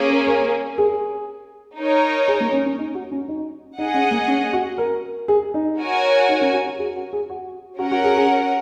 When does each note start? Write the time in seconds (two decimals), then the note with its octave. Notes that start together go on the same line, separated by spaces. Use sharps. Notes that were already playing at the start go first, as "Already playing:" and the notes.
Already playing: A#3 C#4 G#4
0.11 A#4
0.27 A#4
0.47 A#4
0.78 G#4
1.78 D#4 A#4 C#5
2.28 G#4
2.40 A#3
2.53 C#4
2.66 C#4
2.79 D#4
2.95 F#4
3.11 C#4
3.28 D#4
3.78 D#4 G#4 D#5 F#5
3.94 C#4
4.11 A#3
4.28 C#4
4.53 F#4
4.78 A#4
5.28 G#4
5.54 D#4
5.78 F#4 A#4 C#5 G#5
6.29 D#4
6.41 C#4
6.53 F#4
6.67 F#4
6.79 G#4
6.96 F#4
7.13 G#4
7.30 F#4
7.79 C#4 F#4
7.82 A#4 F#5
7.92 F#4
8.04 G#4
8.17 G#4